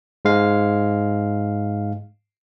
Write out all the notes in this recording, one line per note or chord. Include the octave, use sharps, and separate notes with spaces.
G#2 G#3 F5